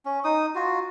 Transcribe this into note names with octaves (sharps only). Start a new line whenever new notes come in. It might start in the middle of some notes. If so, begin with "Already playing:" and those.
C#4
D#4 D#6
F4 F#4